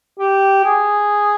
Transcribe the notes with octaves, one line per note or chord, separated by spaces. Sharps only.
G4
G#4